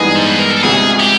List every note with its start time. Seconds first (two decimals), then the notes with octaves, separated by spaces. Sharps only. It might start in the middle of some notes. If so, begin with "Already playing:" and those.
Already playing: G2 E3 G#3 B3 D#4 G#4
0.15 C5
0.27 B4
0.39 A#4
0.51 A4
0.63 D2 C3 F3 G#3 G#4
1.00 G4